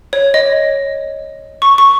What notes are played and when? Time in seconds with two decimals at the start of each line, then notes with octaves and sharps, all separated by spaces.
0.13 C#5
0.34 D#5
1.62 C#6
1.78 C#6